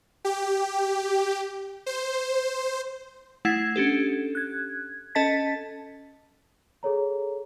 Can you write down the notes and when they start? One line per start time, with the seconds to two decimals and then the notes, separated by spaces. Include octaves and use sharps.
0.25 G4
1.86 C5
3.45 A3 E4 F#5 G#6 C7
3.76 C#4 D4 G4 A4
4.35 F#6 G#6
5.15 C#4 A4 D#5 A5 A6 B6
6.83 G#4 A4 C#5 A#5